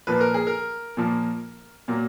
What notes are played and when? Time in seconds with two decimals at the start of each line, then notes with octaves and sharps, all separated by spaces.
0.07 A#2 F3 A#3 B4
0.20 A#4
0.34 G#4
0.47 A#4
0.97 A#2 F3 A#3
1.88 A#2 F#3 A#3